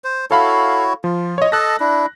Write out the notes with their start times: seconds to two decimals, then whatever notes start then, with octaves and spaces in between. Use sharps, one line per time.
0.04 C5
0.31 E4 F#4 A4 C#5 F5 B5
1.04 F3 F4
1.38 C#5 D#5
1.52 A4 D#5 A5 F#6 A#6
1.80 D4 E4